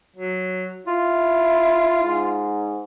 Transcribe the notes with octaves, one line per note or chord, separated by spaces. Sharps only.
F#3
E4 F4
G#2